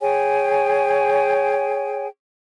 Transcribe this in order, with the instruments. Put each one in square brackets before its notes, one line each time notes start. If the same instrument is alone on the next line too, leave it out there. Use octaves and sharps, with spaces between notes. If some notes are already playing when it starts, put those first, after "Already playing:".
[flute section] G#4 C#5 G5 G#5